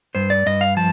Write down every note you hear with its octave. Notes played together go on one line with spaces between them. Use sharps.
G2 C5
D5
G2 D#5
F5
F3 A5